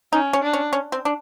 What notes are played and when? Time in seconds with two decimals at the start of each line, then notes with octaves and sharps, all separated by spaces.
0.13 C#4 D#4
0.33 C#4
0.43 D4
0.53 C#4
0.73 C#4
0.92 C4
1.05 D4